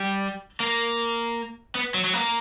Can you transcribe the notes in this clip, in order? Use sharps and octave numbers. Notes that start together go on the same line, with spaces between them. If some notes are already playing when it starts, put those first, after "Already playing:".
Already playing: G3
A#3
B3
F#3
F#3
A#3